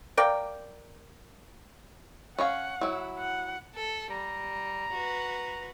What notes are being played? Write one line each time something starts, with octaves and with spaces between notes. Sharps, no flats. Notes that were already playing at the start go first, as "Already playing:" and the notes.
A#4 D5 F5 G5
C#4 C#5 F5 F#5
F#3 E4
F#5
A4
G3 A#5
F#4 B4